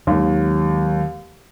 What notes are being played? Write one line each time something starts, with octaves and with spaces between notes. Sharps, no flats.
D#2 D#3 F#3 G#3